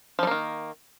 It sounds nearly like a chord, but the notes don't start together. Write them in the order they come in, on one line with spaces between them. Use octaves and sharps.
F3 G3 A#3 D#3